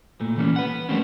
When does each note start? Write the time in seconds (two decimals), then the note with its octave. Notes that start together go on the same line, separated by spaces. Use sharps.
0.21 A#2 A3
0.38 E3 G3 A#3 C#4
0.56 B4 F#5
0.89 F3 G3 A3 A#3 C4 C#4